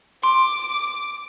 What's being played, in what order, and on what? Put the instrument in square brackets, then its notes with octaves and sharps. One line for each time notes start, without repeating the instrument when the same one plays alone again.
[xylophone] C6 [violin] D6